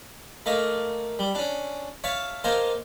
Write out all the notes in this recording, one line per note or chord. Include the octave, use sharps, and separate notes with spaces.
A3 A#3 D#5 F5
G3
C#4 D4
C#5 E5 F5 A5 C#6
A#3 C5 D#5 F5 G#5 A5